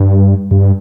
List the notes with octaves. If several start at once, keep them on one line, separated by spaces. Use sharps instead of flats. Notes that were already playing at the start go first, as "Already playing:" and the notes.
Already playing: G2
G2